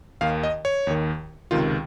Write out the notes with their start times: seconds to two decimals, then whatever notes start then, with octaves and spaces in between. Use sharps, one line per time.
0.21 D#2 D#3 F5
0.43 D#5
0.65 C#5
0.87 D#2 D#3
1.51 C#2 C3 D#3 F4